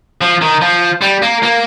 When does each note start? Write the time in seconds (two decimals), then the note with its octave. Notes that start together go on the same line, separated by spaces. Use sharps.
0.22 F3
0.42 D#3
0.62 F3
1.02 G3
1.23 A#3
1.43 A#3